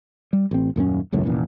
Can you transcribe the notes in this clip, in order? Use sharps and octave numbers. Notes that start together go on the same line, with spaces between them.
G3
A1 C4
D#1 F#2 G#3 C#4
G#1 C#2 F#2 A2
F1 A#2 E3 C#4